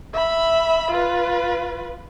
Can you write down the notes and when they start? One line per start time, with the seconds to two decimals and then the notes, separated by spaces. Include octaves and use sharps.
0.13 E5 B5
0.91 F4 B4